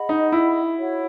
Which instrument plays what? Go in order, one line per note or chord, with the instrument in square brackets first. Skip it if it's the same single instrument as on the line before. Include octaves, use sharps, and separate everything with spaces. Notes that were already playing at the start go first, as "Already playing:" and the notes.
Already playing: [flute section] G#4 D#5 F#5 B5
[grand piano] D#4
E4
[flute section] F#4 C#5 F#5